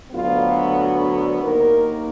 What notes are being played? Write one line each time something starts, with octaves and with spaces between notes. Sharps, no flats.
D2 D3 F#3 B3 F4
D#2 D#3 A#3 A#4